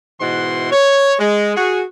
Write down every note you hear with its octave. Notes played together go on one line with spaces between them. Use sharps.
G#2 B2 E3 E4 F#5 C6
C#5
G#3
F#4 G#4